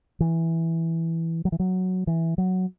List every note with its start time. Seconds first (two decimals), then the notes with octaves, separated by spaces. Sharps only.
0.20 E3
1.45 F#3
1.52 E3
1.59 F#3
2.07 E3
2.38 F#3